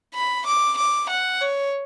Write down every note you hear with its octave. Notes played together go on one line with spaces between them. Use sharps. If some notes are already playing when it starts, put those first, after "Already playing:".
B5
D6
D6
F#5
C#5